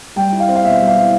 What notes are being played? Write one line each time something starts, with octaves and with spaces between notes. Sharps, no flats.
G3 G5
E4
F5
C4
F5
B2 E5
G3
F5
E4